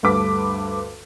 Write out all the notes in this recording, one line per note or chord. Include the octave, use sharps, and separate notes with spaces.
D2 G2 A4 B4 D6 B6